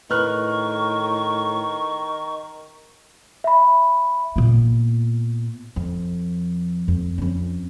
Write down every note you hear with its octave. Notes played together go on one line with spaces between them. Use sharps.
A2 D#3 B4 C#6 F6 F#6
E5 B5
A#2 B3
F2
F2
F2 C#4